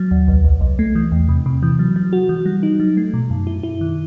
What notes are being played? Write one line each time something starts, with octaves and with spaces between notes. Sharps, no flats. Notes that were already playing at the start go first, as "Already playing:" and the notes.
Already playing: F#3
D#2
C2
C2
C2
A3
E3
E2
C3
C3
E3
F#3
F#3
F#4
E3
G3
D#4
F#3
A3
B2
F#2
E4
E4
D#3